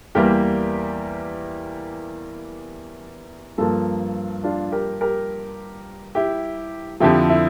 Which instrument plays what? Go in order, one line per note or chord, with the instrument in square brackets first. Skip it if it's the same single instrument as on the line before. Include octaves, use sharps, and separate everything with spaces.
[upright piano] E2 E3 G3 A#3 G4 A#4
G2 F3 A#3 F4 A4
D4 F4
G4 A#4
G4 A#4
E4 G4
F2 D3 F3 E4 G4
E4